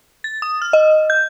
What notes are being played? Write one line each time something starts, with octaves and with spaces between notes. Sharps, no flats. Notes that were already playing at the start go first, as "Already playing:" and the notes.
A6
D#6
F6
D#5
G6